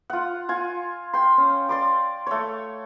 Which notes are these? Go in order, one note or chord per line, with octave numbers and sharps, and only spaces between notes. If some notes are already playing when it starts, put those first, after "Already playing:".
F4 F#5
F4 G#5
G5 C6
C#4
D5 C6 D6
A3 C#5